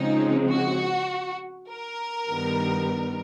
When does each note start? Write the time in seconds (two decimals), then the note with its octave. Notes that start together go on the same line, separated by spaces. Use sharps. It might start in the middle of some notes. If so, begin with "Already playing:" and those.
Already playing: C#3 F3 G#3 C4 D#4
0.50 F#4
1.69 A#4
2.29 G2 D#3 G3 B3